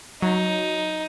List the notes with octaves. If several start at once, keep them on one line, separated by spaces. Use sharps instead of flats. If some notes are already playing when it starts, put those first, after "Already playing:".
F#3 D#4